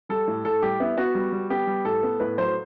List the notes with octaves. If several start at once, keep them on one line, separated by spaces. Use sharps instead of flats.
G3 A4
A2
A2 A4
G3 G4
B3 E4
B3 F#4
G3
G3
B3 G4
G3
A2 A4
B3
A2 B4
F#3 C5